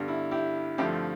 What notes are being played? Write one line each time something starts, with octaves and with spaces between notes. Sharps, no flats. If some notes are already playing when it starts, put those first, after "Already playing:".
Already playing: G2 D3 G3 B3
E4
E4 G4
G2 D3 F3 A3 C4 E4 G4